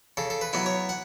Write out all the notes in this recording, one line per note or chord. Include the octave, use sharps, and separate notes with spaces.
C#3 A4
A4
B4
F#3 B3 E4
C#5
F#5